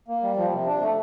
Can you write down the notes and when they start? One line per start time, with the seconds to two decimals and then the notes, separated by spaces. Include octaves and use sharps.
0.08 A#3
0.23 G3
0.37 F3
0.52 C3
0.67 D4
0.82 A3